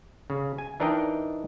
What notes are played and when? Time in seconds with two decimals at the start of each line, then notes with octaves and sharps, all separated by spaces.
0.30 C#3
0.58 G#5
0.80 E3 D4 D#4 A#4 D#5 G5